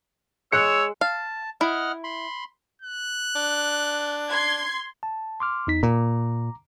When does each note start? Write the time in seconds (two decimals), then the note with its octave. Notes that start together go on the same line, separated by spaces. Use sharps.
0.52 G#3 C#5 E6 F#6 C#7
1.01 F5 A5
1.61 E4 D#5 F#5 F6
2.04 B5 C6
2.82 F#6
3.36 D4
4.29 C6 G#6
5.03 A5
5.40 C6 D6 F6
5.67 E2 D#4 B6
5.83 A#2 A#5 D6